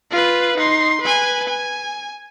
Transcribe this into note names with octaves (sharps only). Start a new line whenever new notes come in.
F4 B4
D#4 C6
B4 G#5
G#5